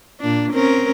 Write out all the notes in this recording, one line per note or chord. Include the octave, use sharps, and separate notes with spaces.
A#2 D4
C4 C#4 A#4